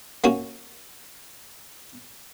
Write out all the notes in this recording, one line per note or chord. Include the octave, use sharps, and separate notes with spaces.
A#3 C#4 F#4